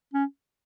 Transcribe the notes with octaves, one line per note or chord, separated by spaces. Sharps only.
C#4